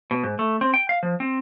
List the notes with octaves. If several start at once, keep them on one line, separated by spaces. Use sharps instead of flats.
B2
G#2
A3
C4
G5
F5
F3
C4